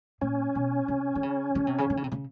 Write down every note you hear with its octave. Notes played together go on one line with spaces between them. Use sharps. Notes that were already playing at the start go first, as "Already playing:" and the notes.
A#2 C#4
B2
C3
D3
C#3
C#3
C3
C#3
D3
C#3
C3
C#3